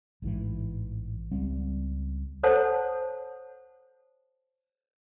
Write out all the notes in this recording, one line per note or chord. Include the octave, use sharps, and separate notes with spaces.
A1 G#2 B2 E3
C#2 G3 C4
A4 C5 C#5 F#5 A5